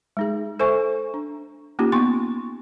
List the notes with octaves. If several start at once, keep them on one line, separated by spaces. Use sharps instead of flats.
G#3 D#4 G#4
A4 C5 E5 G#5 C#6
D4
A#3 C#4 D#4 F4 G4
B3 C6 C#6